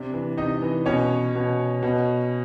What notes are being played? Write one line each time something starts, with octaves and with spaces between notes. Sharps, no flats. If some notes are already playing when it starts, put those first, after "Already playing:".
Already playing: C3 D4
E3
C3 D#4 D#5
E3
B2 C#4 C#5
B2
B2